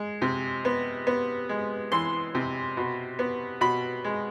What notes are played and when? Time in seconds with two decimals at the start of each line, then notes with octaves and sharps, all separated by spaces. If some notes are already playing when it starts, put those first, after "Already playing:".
Already playing: G#3
0.22 C3
0.65 B3
1.07 B3
1.49 G#3
1.92 E3 C6
2.35 C3
2.77 B2
3.19 B3
3.61 B2 B5
4.04 G#3